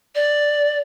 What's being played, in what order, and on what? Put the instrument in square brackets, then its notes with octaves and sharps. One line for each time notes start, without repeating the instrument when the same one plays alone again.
[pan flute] D5